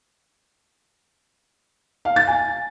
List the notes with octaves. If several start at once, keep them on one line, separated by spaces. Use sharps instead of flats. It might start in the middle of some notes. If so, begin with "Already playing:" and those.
F5
A6
G#5